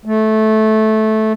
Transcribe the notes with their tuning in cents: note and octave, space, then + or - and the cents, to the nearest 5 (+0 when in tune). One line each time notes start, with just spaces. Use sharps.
A3 -15